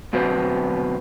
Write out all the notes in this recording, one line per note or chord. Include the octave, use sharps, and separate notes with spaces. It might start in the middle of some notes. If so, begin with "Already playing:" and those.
D2 B2 F#3 B3 C4